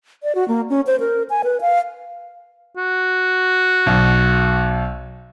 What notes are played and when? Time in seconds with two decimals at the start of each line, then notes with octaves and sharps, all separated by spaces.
0.23 D5
0.35 F#4
0.48 A#3
0.70 C#4
0.87 C5
1.00 A#4
1.30 G#5
1.44 B4
1.61 F5
2.77 F#4
3.86 B1